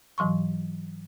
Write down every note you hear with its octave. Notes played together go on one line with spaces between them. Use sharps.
G#2 E3 F#3 C6 C#6